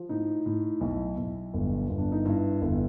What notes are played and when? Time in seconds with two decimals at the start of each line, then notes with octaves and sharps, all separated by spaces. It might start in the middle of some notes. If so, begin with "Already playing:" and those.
Already playing: F3
0.09 A2 D#4
0.46 A2
0.81 B1 E4
1.17 B1
1.54 G1
1.89 G1
1.98 D4
2.12 D#4
2.25 G2 E4
2.62 G1